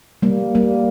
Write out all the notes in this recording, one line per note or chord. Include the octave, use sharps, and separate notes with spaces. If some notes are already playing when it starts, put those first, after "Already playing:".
G3 A#3
G3 A#3